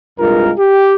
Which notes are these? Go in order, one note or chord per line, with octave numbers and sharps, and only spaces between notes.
C2 G2 G#3 F4 A#4
G4